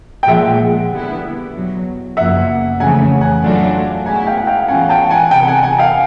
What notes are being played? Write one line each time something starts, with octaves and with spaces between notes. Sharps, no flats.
G5
A#2 F3 G#3 E5 F#5
D3 G3 B3 E4
E2 B2 F#3
F#2 C#3 F3 A#3 E5 F#5
F2 C#3 E3 A3 F#5 G#5
F#5 G#5
A2 F#3 A3 D4 F4
B2 G#3 C#4 E4 F#5 G#5
F5 G5
F#5
F5 G5
A2 E3 G#3 C#4 F4 F#5 G#5
G5 A5
F#5 G#5
C3 E3 G#3 G5 A5
F#5 G#5
F#5 G#5
F5 G5